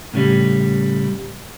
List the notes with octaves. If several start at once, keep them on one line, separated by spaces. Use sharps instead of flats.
A2 C#3 G3